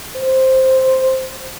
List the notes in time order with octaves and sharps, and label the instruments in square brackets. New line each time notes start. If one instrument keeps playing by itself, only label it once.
[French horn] C5